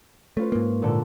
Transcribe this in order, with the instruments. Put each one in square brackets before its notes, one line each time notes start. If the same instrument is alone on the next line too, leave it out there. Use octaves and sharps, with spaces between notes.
[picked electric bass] A3 [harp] C#4 F4 B4
[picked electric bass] G#2 A#3
[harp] A#2 D3 A4